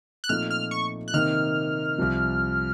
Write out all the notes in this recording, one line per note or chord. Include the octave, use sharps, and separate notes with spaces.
F#6
A#2 F3 A3 C4 D#4 F6
F6
C#6
F#6
C3 D#3 A#3 D#4 F6
C2 C3 F3